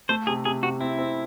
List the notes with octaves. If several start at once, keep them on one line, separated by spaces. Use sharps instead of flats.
A3 C5
C3 G#4
C3 G#4
C3 F#4
C4 E4
C4